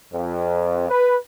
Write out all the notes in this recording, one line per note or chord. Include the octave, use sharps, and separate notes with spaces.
F2
B4